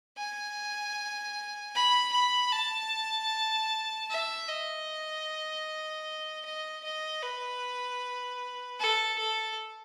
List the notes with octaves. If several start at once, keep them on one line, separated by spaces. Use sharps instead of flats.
G#5
B5
B5
A5
E5
D#5
D#5
D#5
B4
A4
A4